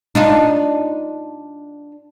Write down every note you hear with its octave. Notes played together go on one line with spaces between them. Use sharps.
D4 D#4 F4